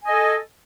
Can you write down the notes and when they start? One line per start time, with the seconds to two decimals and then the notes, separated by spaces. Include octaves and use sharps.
0.04 G#5
0.07 D#5
0.09 A4